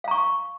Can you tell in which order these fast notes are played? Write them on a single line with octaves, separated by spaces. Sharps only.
F5 A#5 C#6